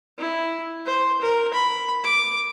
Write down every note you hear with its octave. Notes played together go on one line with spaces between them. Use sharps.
E4
C5
A#4
B5
D6